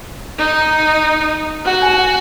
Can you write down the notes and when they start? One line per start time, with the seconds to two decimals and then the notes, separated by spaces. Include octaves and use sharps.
0.38 D#4
1.65 F#4 F#5
1.82 G#5
1.93 G#5
1.97 F#5